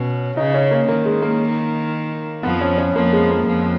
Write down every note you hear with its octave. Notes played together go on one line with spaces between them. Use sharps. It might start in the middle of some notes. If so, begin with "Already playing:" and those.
Already playing: B2 C#4
C#3 D#4
C#4
A#3
D#3 A#3
G#3
A#3
F2 F3 B3
C#4
C#4
F2 F3 A#3
G#3
A#3
F2 F3